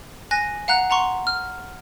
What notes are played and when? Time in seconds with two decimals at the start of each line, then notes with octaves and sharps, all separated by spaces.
0.31 G#5 F#6 A#6
0.68 F5 F#5 A#5 F#6
0.90 F#5 A#5 C6 C#6
1.27 F6